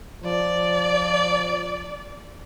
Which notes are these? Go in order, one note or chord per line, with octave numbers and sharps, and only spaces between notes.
F3 D5